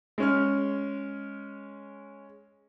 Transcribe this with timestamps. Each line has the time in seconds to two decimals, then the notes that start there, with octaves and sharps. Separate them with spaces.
0.18 G#3 C#4 F6